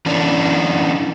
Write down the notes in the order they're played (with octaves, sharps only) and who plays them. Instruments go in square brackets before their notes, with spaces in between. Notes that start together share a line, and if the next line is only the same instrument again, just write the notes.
[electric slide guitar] E3 C#4 D4